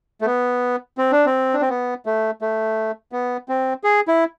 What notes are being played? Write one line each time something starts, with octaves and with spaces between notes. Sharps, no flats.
A3
B3
C4
D4
C4
D4
C4
B3
A3
A3
B3
C4
G#4
E4